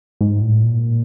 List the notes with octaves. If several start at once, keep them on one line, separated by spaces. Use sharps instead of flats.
G#2
A2
A#2